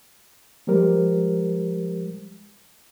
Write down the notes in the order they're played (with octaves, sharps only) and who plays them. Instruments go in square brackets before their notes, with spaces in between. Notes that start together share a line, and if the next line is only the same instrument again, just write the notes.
[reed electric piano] F3 G3 G#3 G4 A#4 C5